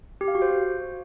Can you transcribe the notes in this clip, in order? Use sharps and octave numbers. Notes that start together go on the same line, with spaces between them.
G4
F5
F#4
C5